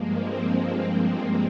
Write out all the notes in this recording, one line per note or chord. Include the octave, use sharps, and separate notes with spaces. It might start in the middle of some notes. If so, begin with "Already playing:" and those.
Already playing: G2 F3 G#3 A#3
C4
A#3